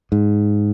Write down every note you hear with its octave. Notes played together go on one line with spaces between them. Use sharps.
G#2